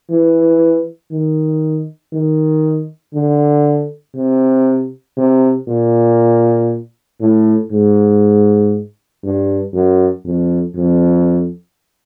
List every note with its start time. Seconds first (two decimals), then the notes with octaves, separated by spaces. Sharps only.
0.10 E3
1.12 D#3
2.14 D#3
3.14 D3
4.16 C3
5.17 C3
5.68 A#2
7.21 A2
7.72 G#2
9.24 G2
9.74 F#2
10.26 F2
10.76 F2